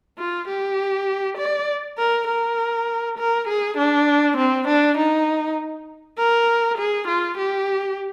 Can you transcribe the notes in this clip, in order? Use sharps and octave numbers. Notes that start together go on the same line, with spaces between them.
F4
G4
D5
A#4
A#4
A#4
G#4
D4
C4
D4
D#4
A#4
G#4
F4
G4